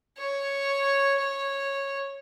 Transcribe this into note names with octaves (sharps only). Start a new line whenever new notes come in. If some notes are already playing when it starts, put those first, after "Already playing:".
C#5
C#5